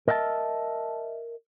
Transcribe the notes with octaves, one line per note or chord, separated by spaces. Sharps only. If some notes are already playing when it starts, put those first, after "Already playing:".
A#4 D#5 E5 F#5 A5